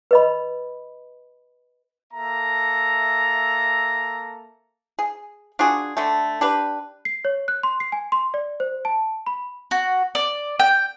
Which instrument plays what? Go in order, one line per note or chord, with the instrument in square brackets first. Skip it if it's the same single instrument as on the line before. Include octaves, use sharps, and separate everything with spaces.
[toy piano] B4 D#5 B5
[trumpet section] A#3 A4 E5 A#5
[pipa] G#4
D4 F4 F#4 G#4
D3 A3
D4 G4 B4
[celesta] C7
C#5
F#6
C6
C7
G#5
C6
D5
C5
A5
B5
[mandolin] F#4
D5
G5